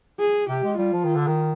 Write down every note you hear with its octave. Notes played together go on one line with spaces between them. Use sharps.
G#4
C3 G4
G#3
G3 F4
F3
D#3
D3
D#3